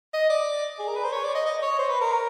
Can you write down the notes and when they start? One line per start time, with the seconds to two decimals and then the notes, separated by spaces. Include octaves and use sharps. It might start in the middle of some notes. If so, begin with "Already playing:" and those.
0.14 D#5
0.30 D5
0.79 G#4
0.88 A#4
0.96 B4
1.04 C5
1.12 C#5
1.24 D5
1.35 D#5
1.46 D#5
1.62 C#5
1.79 C5
1.89 B4
2.02 A#4